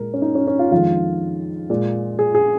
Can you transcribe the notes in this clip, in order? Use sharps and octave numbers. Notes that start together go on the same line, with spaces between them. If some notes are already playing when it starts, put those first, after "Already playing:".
Already playing: A#2 G#3 A#4
C#4
D#4
C#4
C#4
F4
F2 D#3 G#3 F4
A#2 G#3
G#4
G#4